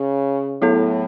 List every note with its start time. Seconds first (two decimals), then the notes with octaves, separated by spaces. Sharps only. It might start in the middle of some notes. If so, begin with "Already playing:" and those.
Already playing: C#3
0.61 A2 F#3 B3 E4 A4 C#5